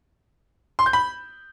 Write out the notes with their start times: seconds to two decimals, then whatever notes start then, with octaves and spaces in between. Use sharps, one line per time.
0.79 C6
0.86 G6
0.93 B5